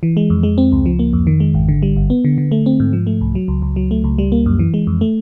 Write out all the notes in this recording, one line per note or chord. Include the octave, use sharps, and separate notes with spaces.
E3
G#3
F2
G#3
C4
C#2
F3
A#3
F2
D#3
G#3
G#1
D3
G3
G1
B3
D3
D3
A3
C4
G#2
F3
A3
C2
F#3
C#2
C#2
F#3
A3
C#2
G3
A#3
F#2
E3
G#3
F2
A3